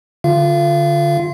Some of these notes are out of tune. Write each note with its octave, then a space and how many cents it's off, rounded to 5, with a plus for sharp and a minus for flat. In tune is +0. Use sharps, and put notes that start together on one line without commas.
D3 +0 F4 +0 F5 -40